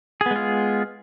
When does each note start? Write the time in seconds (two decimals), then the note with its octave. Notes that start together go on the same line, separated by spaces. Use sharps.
0.21 G#4
0.26 B3
0.31 G#3
0.36 F4